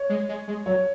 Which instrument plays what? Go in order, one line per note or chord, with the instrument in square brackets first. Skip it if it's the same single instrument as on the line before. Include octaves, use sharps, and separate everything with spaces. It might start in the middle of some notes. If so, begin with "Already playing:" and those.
Already playing: [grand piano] C#5
[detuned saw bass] G#3
G#3
G#3
[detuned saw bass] F#3 [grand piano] C#5